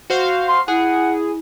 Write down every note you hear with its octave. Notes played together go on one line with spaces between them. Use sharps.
F#4 C5 F5
C6
E4 G#4 F#5